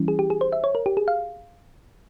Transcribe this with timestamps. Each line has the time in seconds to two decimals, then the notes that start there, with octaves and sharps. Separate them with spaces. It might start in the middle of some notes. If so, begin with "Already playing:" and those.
Already playing: E3 G3 C#4 E4
0.08 G#4
0.19 G4
0.30 G#4
0.41 C5
0.52 E5
0.64 C#5
0.75 A#4
0.86 G4
0.97 G#4
1.08 F5